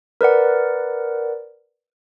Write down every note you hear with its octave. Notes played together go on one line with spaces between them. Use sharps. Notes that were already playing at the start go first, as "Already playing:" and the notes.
A#4 B4 D5 F#5